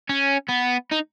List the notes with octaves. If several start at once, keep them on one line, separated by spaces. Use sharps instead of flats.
C#4
B3
D#4